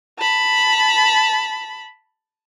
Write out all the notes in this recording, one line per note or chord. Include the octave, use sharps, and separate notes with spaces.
A5 B5